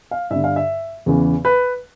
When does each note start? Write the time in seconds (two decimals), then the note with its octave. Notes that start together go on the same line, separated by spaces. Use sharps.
0.11 F5
0.30 G2 E5
0.36 D3
0.44 F5
0.56 E5
1.06 E2 C#3 E3
1.45 B4